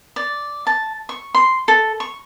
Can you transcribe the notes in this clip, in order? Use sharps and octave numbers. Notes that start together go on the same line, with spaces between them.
D5
A5
C#6
C6
A4
C#6